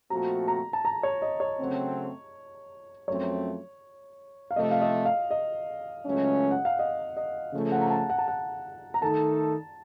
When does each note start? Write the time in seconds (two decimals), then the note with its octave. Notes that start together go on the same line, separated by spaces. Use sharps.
0.10 A#2 F3 A3 C4 F#4 A#5
0.48 A#5
0.73 A5
0.85 A#5
1.03 C#5
1.22 D#5
1.40 C#5
1.60 C#3 F#3 A3 C4
3.07 F#2 F3 A3 C4 C#5
4.51 F5
4.56 C3 F3 A3 D#5
4.71 F5
4.81 D#5
5.05 F5
5.31 D#5
6.05 C#2 C#3 F#3 A3 C#4
6.51 F#5
6.65 F5
6.79 D#5
7.17 D#5
7.53 C#3 F3 A3
7.72 F#5
7.81 A#5
7.90 A5
8.10 F#5
8.19 A5
8.28 F#5
8.94 A#5
9.02 D#3 A3 D#4 A4 A5